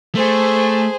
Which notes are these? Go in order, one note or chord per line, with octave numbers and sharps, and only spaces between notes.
A3 G#4 C5